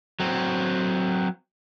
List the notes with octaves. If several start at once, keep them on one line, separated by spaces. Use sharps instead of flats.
F#3 C4